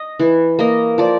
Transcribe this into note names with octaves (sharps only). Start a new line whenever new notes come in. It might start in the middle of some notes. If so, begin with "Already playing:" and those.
Already playing: D#5
E3
A#3 D#5
F3 D5